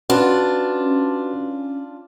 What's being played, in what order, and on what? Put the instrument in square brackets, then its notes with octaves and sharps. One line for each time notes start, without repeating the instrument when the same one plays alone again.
[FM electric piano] C#4 [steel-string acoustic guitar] D4 F4 [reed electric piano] F#4 B4